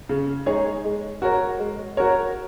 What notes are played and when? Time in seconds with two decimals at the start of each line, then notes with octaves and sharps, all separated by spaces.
0.09 C#3
0.46 G#3 D#4 G#4 C#5
0.84 G#3
1.22 F#4 A#4 C#5
1.59 G#3
1.97 F#4 A#4 C#5